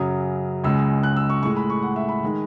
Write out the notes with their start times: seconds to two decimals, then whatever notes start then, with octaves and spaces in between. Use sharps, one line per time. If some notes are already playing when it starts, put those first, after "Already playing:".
Already playing: F#2 C#3 F#3 D#6
0.64 C#2 C#3 G#3 E6
1.03 F#6
1.16 E6
1.29 C#6
1.43 A2 C#6
1.45 G#3
1.57 B5
1.70 C#6
1.83 F#5
1.96 E5
2.09 B5
2.23 D#3 G#3